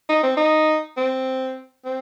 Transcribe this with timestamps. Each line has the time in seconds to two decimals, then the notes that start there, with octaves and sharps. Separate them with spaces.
0.09 D#4
0.23 C4
0.36 D#4
0.97 C4
1.85 C4